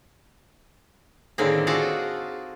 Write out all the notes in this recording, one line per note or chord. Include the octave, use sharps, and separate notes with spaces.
A2 D3 D#3 A#3 C4 G#4
F4 F#4 G#4 A4 D5 D#5